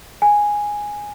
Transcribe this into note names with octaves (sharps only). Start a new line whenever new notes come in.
G#5